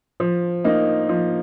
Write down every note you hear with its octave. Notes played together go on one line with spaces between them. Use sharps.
F3
A#3 D#4
F3